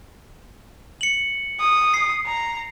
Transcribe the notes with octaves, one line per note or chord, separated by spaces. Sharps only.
C#7 F#7
D#6
C7
A#5